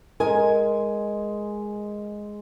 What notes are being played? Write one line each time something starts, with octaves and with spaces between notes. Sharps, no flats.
G#3 A#4 G#5